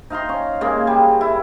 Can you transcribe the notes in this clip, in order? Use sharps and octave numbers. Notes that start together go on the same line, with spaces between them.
D#4 F5 A#5 C6
C#4
C#3 G#3 A#3
G3
E4